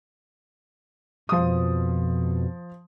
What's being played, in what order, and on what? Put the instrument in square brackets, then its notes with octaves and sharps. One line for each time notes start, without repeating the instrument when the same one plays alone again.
[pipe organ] F2 B2 [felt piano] F3 D#6